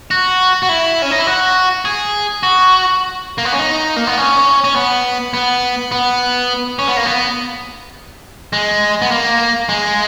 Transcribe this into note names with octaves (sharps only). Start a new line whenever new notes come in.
F#4
F#4
E4
C#4
D#4
E4
F#4
G#4
F#4
A#3
B3
C#4
D#4
A#3
B3
C#4
C#4
B3
B3
B3
C#4
B3
A#3
B3
G#3
B3
A#3
G#3